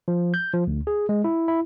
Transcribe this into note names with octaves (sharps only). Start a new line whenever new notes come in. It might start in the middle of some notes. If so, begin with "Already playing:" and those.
F3
G6
F3
D2
G#4
G#3
E4
E4